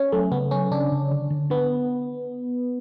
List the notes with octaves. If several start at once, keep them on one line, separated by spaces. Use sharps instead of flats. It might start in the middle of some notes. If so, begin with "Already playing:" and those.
Already playing: C#4
F#3 A3
C#3 B3
F#3 C#4
C#3 D4
C#3
D3
D3
B3 D4